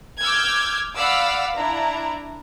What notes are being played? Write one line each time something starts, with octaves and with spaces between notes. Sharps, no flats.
D6 E6 F6 G6 G#6
D5 F5 F#5 B5 D6 E6
D4 E4 A#5